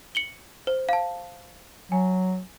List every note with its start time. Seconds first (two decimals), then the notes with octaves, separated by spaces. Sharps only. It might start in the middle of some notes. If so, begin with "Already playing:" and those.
0.15 C#7 F#7 G7
0.67 C5
0.89 F5 A5
1.92 F#3 G#5